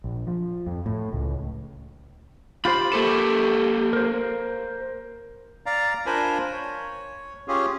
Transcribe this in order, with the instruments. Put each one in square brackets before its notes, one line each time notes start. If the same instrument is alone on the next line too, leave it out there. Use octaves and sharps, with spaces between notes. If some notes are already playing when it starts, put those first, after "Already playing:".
[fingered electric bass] A#1
F3
F2
A2
C#2
[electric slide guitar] F4 G4 C5 [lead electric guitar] B5
[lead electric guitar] A#3 A4 [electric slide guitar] G4
[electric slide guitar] A#4 C5
[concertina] D5 F5 A#5
D4 F4 A#4 C5 G#5 B5
C#5
C#4 F4 G4 G#4